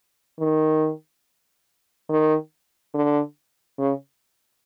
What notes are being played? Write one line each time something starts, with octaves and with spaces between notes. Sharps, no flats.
D#3
D#3
D3
C#3